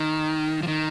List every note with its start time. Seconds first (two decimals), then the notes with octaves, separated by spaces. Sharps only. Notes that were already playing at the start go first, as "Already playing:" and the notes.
Already playing: D#3
0.63 F3
0.68 D#3